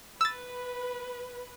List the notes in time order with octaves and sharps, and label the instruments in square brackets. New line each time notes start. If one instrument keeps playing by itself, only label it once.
[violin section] B4 [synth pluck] E6 A6